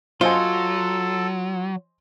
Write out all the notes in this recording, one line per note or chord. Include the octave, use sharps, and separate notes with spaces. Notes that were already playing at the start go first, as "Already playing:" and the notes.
F#3 F4 A4 C5 D#5 G#5